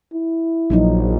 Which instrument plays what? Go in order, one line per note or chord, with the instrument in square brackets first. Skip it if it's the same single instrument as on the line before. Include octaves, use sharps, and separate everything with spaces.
[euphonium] E4
[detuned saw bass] A#1 [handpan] F3 F#3 D#4